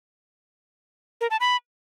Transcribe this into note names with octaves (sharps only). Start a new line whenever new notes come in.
A#4
A5
B5